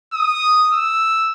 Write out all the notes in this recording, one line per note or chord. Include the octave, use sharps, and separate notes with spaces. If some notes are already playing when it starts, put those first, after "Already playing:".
D#6
E6